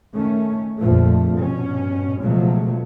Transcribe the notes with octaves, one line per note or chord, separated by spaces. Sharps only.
D#3 A3 C#4
A#1 F2 A#2 D3 F3 A3
G2 B2 C#4
C#2 B2 F3 F#3 A3